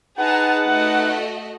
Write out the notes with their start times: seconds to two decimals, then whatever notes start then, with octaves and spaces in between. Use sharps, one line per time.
0.19 D#4 G#4 B4 F#5 A5 A#5
0.66 A3 F#4 D#5